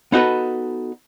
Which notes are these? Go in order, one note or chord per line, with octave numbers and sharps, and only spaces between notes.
B3 D#4 F#4 A4 B4